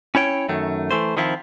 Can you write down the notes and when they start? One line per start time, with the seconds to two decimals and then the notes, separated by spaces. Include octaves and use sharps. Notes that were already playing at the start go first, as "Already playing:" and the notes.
0.15 C#4 E4 C#5 G5
0.49 F#2 D#3 A3
0.91 E3 A3 C5
1.17 D#3 F3 C4 E4 F4